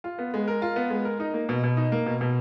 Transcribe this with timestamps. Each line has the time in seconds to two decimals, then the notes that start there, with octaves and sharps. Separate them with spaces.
0.04 F4
0.18 B3
0.34 G#3
0.48 A#4
0.62 F4
0.76 B3
0.90 G#3
1.05 A#4
1.20 D#4
1.34 A#3
1.49 B2
1.63 B2
1.77 D#4
1.92 A#3
2.06 B2
2.21 B2